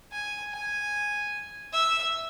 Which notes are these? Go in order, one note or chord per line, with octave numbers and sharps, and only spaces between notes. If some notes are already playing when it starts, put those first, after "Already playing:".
G#5
G#5
E5